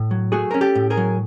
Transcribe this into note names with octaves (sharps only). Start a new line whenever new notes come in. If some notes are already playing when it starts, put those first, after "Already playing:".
Already playing: A2
F#3
A3 F#4 G#4
C#4 A#4
G4 A4
A2
G#4 A#4
F#3